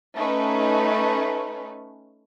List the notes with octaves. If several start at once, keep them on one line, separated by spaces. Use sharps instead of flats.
A3 C#4 D#4 B4